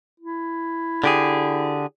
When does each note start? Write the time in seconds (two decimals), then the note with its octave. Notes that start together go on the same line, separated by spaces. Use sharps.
0.20 E4
1.04 D3 G4 G#4